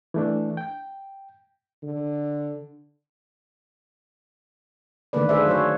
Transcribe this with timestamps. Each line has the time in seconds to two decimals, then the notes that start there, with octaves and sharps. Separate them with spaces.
0.14 E3 A3 D4
0.57 G5
1.83 D3
5.13 D3 D#3 A3 A#3 B4 D5
5.29 D4 G#4 B4 C5 D5 E5
5.47 F#3 C5 C#5